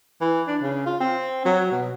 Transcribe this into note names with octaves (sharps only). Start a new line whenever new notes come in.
E3
D4
C#3
F4
C4
F#3
B2